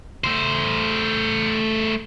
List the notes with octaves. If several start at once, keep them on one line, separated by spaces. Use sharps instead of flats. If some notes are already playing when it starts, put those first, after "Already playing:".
A3 C5